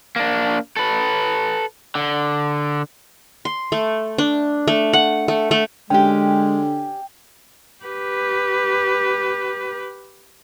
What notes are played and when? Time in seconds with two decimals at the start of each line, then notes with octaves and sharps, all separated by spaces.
0.16 A#3 D4
0.76 A4 B4
1.95 D3
3.45 C6
3.72 A3
4.18 D4
4.68 A3
4.93 F#5
5.28 A3
5.51 A3
5.90 D3 G#3 C#4 G4 G5
7.83 G4 B4